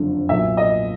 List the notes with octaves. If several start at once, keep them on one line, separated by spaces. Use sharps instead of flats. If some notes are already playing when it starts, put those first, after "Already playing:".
Already playing: F#1 F2 D3
B1 A#2 E5
D#5